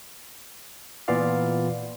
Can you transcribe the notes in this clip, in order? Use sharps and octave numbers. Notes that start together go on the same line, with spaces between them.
A#2 E3 B3 F4 D5 F5